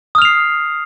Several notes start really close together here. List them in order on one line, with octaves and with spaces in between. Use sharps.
D#6 F6 F7 C7